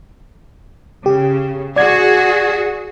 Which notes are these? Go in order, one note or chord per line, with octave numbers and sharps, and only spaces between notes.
C#3 G4
F#4 G#4 D5 G#6